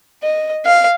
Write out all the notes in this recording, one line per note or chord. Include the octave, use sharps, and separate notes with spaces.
D#5
F5